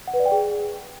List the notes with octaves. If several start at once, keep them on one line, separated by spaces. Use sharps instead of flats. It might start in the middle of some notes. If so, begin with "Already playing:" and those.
F#5
B4
D5
G5
G#4